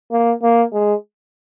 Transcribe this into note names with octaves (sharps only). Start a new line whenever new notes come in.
A#3
A#3
G#3